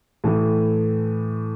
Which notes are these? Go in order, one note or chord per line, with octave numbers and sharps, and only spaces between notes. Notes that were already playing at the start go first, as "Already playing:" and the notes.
A2 E3 A3